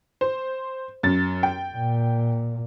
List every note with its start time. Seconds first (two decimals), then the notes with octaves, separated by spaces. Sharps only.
0.21 C5
1.03 F#2 A6
1.43 G5
1.76 A#2